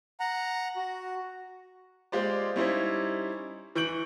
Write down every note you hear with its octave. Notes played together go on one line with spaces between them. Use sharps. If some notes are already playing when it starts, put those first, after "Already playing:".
F#5 A#5
F#4
G#3 F4 G4 C5 D5
G3 C#4 D#4 E4 C5
E3 C#6 G6 D7 F#7